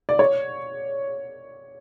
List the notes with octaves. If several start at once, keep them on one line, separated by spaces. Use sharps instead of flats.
D5
C#5